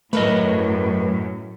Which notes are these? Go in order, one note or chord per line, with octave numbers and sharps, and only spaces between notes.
F#2 A2 A3 A#4 B4 D#5